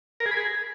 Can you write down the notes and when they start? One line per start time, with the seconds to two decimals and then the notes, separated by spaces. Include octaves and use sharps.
0.20 A#4
0.26 G#4
0.31 B5
0.37 G#4